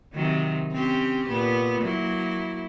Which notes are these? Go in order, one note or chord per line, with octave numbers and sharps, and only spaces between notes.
C3 D#3 F#3
C4 C#4 G4
A#2 B3
F#3 A#3 E4